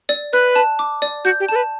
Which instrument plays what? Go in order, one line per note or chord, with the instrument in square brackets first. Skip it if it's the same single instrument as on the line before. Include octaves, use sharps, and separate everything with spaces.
[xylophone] D5
[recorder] B4 [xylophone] F#6
[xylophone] A5
D6
D5
[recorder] F#4 [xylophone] G6
[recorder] G4
[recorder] A4 [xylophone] A5
[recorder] B4